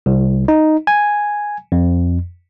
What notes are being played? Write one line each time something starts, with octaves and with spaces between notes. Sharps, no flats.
C2
D#4
G#5
F2